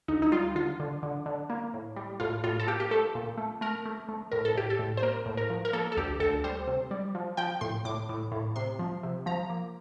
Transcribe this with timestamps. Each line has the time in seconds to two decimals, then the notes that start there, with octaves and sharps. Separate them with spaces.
0.08 D2 D#4
0.22 D#4
0.32 G3 F4
0.55 D3 F4
0.80 D3
1.03 D3
1.26 D3
1.50 A#3
1.74 A2
1.96 G3
2.20 A2 F4
2.44 A2 F4
2.60 A4
2.67 A#3 G4
2.80 G4
2.91 A3 A4
3.15 A#2
3.38 A3
3.61 A3 A#4
3.85 A3
4.09 A3
4.32 A2 A#4
4.45 A4
4.55 A2 G4
4.70 A4
4.79 A2
4.97 C5
5.03 A#3 A#4
5.26 A2
5.37 A#4
5.50 F3
5.65 A#4
5.73 A#3 A4
5.92 A4
5.97 D2 G4
6.20 D2 A4
6.44 G3 C5
6.67 C3
6.91 G3
7.15 F3
7.37 F3 G5
7.61 A2 C6
7.85 A2 D6
8.09 A2
8.32 A2
8.56 C3 C6
8.79 F3
9.03 C3
9.26 F3 A#5
9.50 A#3